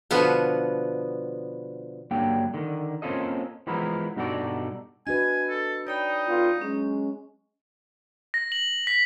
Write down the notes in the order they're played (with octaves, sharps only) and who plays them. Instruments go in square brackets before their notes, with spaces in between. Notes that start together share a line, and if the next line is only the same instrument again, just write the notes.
[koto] B2 D3 F3 B3
[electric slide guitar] G2 D3 F#3 A#3 G5
D3 D#3
A#3 C4 C#4 F4 A4 D#5
E3 F3 G#3 B3 E4 A#4
G2 B2 D#4 F#4 A4 D5
[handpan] D4 F#4 B4 [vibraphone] D#5 [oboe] G#5
[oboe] A4
[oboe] D#4 [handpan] C#5 [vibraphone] D5 G5 B5
[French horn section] D3 B3 F4
[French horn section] F#3 G#3 [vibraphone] C#4
[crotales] A#6
F#7
B6